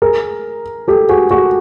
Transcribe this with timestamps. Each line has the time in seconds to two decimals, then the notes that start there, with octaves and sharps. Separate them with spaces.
0.02 G#4 A#4
0.88 G4 A4
1.09 F#4 G#4
1.31 F#4 G#4